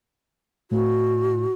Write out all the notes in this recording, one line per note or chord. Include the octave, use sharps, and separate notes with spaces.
A2 F#4